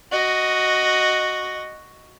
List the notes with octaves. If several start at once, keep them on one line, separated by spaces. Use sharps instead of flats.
F#4 D#5